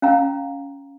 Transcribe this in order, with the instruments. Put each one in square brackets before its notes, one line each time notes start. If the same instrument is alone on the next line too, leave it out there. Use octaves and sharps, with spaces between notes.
[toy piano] C#4 F5 A#5